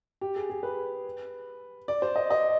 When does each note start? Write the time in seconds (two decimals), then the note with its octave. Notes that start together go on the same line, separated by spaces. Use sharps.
0.21 G4
0.36 G#4
0.50 G#4
0.63 B4
1.88 D5
2.02 C5
2.16 D#5
2.31 D#5